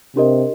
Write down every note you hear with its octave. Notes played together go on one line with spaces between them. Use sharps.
C3 D4 G4 A#4 D#5